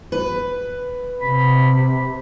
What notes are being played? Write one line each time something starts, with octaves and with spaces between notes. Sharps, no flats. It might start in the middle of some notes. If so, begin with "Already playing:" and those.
B4
C3 B5